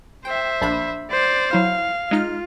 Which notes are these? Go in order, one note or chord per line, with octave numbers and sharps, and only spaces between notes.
C5 E5 G5
A#1 D4 B5
C5 D5
F#3 E4 F5
G#3 D#4 F4 F6